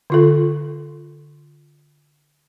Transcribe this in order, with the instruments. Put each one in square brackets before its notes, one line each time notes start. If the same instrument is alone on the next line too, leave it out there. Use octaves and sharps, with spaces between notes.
[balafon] D3 F4 A4